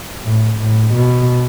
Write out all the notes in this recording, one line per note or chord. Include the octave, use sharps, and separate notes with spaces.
A2
A2
B2